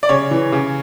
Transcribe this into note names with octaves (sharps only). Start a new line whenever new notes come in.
D5
C#3 C#5
E3
C#3